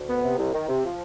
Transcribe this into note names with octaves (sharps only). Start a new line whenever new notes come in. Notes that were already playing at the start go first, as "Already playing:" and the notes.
Already playing: D2
B3
C3
C2
D#3
C3
F3